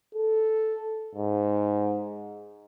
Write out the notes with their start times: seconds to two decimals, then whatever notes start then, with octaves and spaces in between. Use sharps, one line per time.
0.15 A4
1.16 G#2